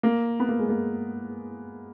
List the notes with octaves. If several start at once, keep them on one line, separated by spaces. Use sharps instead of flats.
A#3
B3
A#3
G#3
A#3